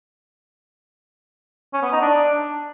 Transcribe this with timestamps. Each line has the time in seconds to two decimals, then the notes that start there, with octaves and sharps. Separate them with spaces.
1.73 C#4
1.83 B3
1.92 D#4
2.01 D4